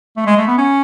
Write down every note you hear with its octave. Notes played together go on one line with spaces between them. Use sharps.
A3
G#3
A3
B3
C#4